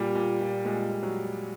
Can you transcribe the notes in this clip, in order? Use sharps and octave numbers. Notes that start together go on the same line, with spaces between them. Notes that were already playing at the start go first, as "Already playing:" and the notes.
Already playing: A#2 G3
A#2
A#2
A#2 G#3
A#2
F#3